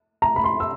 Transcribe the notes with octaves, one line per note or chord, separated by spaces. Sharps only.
A#5
B5
C6
E6